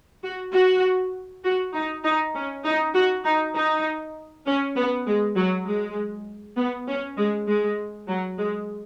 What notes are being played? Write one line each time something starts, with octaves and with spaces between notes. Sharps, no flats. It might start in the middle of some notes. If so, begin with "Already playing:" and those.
F#4
F#4
F#4
D#4
D#4
C#4
D#4
F#4
D#4
D#4
C#4
B3
G#3
F#3
G#3
B3
C#4
G#3
G#3
F#3
G#3